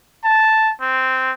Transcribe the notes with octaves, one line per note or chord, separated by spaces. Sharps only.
A5
C4